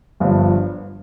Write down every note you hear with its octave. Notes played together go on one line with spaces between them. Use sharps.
G1 G2 D3 F3